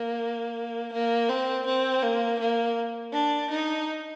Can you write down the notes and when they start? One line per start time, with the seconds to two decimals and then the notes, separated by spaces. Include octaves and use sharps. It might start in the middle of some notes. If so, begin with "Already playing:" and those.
Already playing: A#3
0.93 A#3
1.29 C4
1.66 C4
2.03 A#3
2.40 A#3
3.13 D4
3.51 D#4